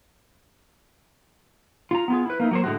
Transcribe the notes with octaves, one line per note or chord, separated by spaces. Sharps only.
F4 A#5
B3 F4 G#4
E4 B4
A#3 D#4 E4
F#3 A#3 C5
A2 D3 G#3 F#4